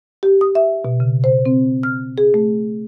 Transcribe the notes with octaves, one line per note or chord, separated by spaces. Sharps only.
G4
D#6
E5
B2
C#3
C5
C4
F6
G#4
A3